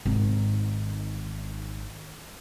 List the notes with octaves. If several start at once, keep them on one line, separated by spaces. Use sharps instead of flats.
G#1 D#3